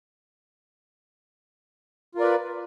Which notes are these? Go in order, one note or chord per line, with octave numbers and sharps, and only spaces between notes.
F4 A#4 B4 D5